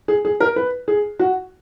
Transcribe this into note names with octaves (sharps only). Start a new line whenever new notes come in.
G#4
G#4
A#4
B4
G#4
F#4